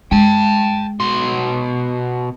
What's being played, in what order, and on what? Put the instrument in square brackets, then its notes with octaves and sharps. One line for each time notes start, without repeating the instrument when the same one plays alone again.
[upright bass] G#3 [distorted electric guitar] G5 A5
[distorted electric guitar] B2 C6